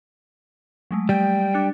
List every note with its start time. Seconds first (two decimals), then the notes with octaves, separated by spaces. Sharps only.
0.91 F#3 G#3 A3
1.09 G3 G5
1.54 D4 F#6 C#7